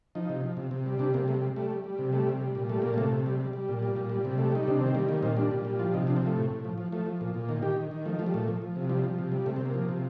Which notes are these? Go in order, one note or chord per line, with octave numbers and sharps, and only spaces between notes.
F3 D#4
C3
F3
C3
C3
G3
C3 D4
C3 A#3
G3 A3
G3
G3 A3
G3
G3
C3
G3 A3
C3
G3
A#2
G3 A3
A#2 A#3
C3 A3
C3
G3
G3
G3
A#2
G3
A#2
G3
C3
G3 A3
G3 D#4
C3 D4
D#3 C4
G3 A#3
D#3 A#3
A#2 C4
G3 D4
A#2
G3
F3 F4
C3 D#4
F3 D4
C4
C3 A3
A2
A2
F3
F3
F3 A3
F3
A#2
A#2
D#3 A#3
D#3 G4
D#3
D#3
F3 A3
F3 A3
G3
A#2 A3
F3
F3
C3
F3 G3
F3
C3
G3
C3 A3
C4
C3
A#3
F3
C3